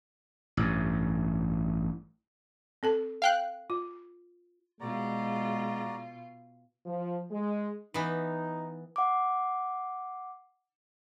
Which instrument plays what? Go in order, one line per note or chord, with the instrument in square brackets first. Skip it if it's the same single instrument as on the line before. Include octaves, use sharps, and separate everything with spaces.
[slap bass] A1 G2
[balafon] C4 A4 A5
[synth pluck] F5 G5 F#6
[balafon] F4
[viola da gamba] B2 F4 [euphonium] G#3 [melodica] F#4 D5 A#5
[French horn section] F3
G#3
[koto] E3 B3 [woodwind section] D#4
[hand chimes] F#5 D6